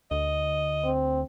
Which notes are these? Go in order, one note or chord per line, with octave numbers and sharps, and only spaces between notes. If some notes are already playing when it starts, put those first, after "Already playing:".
D2 D#5
C4